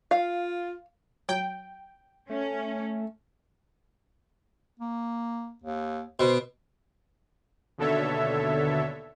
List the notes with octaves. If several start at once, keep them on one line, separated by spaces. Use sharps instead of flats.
F4 F5
F#3 G5
A3 C#4
A#3
D#2
B2 C5
D#2 B2 D3 A4 C#5 E5